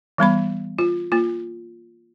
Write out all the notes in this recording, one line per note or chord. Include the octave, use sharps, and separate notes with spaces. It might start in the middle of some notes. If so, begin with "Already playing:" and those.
E3 G3 B3 B5
F4
A#3 F4